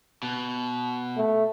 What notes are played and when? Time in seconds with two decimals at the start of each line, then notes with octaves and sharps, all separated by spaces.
0.23 B2
1.17 A3